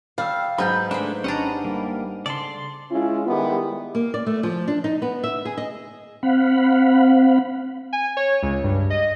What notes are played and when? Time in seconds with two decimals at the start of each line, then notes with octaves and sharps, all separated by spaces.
0.18 G3 F5 G5 E6
0.58 G#2 F#3 D#4 G#4 B4 B5 G6
0.91 G#3 A3 D4 B4 C5
1.24 G#1 C#4 D4 G4 D#5 F#5 A#5 B5
1.65 G3 A#3
2.26 C#3 A4 D5 C6
2.90 G#3 C#4 E4 F4
3.26 D#3 G3 G#3 B3 E4 G4
3.95 A#3
4.14 D5
4.26 A3
4.43 F3
4.68 D4
4.84 D#4
5.02 B3
5.24 E5
5.45 G#4
5.57 D#5
6.23 C4 F5 F#5 B5
7.93 G#5
8.17 C#5
8.43 C#2
8.64 G2
8.90 D#5